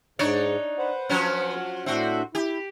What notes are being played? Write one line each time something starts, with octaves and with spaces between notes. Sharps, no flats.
G#2 D4 D#4 C#5
B4 C5 F#5
F3 F#3 C#4
A2 C4 D4 F#4 E5
E4 G4